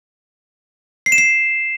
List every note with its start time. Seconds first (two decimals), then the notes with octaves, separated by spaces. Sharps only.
1.06 C7
1.12 E7
1.18 C7